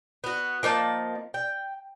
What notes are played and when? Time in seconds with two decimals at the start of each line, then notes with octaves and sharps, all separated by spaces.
0.24 B3 F#4
0.63 F3 A#3 D#4 A5
1.34 G5